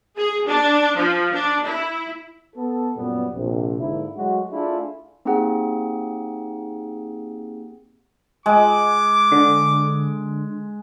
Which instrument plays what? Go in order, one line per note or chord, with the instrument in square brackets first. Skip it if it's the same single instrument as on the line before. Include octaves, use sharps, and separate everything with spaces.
[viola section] G#4
D4
F3
D4
E4
[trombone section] B3 A4
F#2 A#2 G3 B3
A#1 C3
G#2 D3 A#3 E4
F#3 G#3 A3 F#4
A3 D4 E4 F4 G#4
[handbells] A#3 C4 D#4 G4 G#4 F#5
[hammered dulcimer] G#3 [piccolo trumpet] D6
[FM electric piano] D3